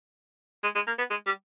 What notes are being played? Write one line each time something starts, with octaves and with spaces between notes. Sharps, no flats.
G#3
G#3
A#3
B3
G#3
G3